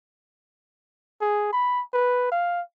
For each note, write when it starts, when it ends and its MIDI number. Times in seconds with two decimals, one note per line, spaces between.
1.22 1.49 68
1.53 1.82 83
1.94 2.29 71
2.32 2.62 77